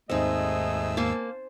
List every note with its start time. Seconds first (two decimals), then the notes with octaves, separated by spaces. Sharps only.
0.10 D#2 G#2 A3 C4 D#4 G#4 D#5 E6
0.97 A#3 C5 G#5 A5